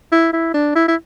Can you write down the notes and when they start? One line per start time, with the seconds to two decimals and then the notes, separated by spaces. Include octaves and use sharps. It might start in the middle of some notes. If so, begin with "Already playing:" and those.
0.12 E4
0.33 E4
0.54 D4
0.75 E4
0.88 E4